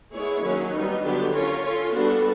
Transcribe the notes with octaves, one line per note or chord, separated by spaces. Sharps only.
G#3 B3 E4 G#4 C#5
D#3 F#3 A#3 C#4
G3 B3 D#4
D3 F#3 B3 D4 G4
C#4 F4 A#4 C#5
C#4 F4 A4
G3 B3 D4 F#4 A4